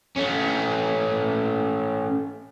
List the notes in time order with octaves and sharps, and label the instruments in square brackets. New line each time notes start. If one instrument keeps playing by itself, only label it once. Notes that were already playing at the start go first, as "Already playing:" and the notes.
[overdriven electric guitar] A3 C#4